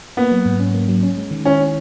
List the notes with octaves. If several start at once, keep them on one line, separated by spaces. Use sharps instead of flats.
A#3 B3
F#3
G#2
C#4
A#3
F#3
C#4
G#3
D#3
C#4 E4
C#4